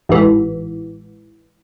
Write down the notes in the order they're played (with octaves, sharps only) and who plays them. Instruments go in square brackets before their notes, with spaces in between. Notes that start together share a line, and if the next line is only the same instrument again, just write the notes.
[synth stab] A1 G#2 E3